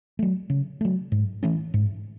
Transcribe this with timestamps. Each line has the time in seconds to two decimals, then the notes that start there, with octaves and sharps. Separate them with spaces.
0.19 F#3 A3
0.50 C#3
0.81 F#3 A3
1.12 G#2
1.43 E3 A3 C#4
1.74 G#2